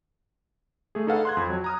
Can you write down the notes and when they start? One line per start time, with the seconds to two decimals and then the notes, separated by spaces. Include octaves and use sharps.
0.95 A3 G#4
1.07 D#4 G#4 A4 B4 F5 F#5
1.25 C6 F#6 G#6
1.37 F2
1.49 F#3
1.64 A#5 D#6 F6